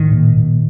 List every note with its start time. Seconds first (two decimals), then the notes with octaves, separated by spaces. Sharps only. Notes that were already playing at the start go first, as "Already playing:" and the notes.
Already playing: A2 D#3
0.11 A#2
0.37 A#2